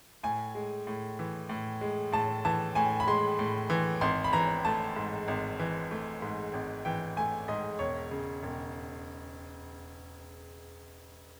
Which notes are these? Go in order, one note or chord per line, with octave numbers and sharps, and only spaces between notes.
A2 G#5
G#3
A2
E3
A2
G#3
A2 A5
E3 A5
A2 G#5
B5
G#3 C6
A2
E3
G#1 C6
B5
E3 A#5
A3 A5
G#2
G#1
E3
A3
G#2
G#1
E3 G5
A3 G#5
G#2 D#5
E1 C#5
C#3
E1